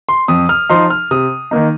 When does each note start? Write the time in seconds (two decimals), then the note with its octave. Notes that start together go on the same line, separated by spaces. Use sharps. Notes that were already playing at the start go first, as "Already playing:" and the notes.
0.09 C6
0.28 F2 D#6
0.49 F6
0.70 F3 D#4 C6
0.90 F6
1.11 C3 D#6
1.51 D#3 A#3 D#4